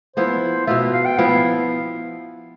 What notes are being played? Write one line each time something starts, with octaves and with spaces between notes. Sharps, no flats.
F3 B3 E4 C5
B2 B3 F4 E5
F5
G5
F3 B3 E4 F5